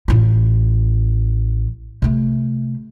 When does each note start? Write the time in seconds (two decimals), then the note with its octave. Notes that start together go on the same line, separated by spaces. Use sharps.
0.08 A1 F4
2.02 C3 A3